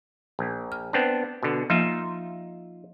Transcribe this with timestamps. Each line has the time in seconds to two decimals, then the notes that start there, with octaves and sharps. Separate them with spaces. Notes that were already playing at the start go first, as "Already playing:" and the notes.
0.39 A#1
0.72 F6
0.93 B3 C4 D4
1.43 B2 D3
1.70 F3 A#3 D#4 F4 E5